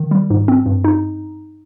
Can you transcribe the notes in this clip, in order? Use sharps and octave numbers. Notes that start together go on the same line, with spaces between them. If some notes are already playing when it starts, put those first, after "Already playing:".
Already playing: D#3
G3
G#2
C4
G2
D#4